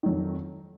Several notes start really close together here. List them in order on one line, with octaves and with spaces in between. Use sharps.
D#3 F#3 F2